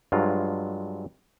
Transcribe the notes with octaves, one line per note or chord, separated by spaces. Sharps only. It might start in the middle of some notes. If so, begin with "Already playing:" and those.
G2 F#3 G#3 F4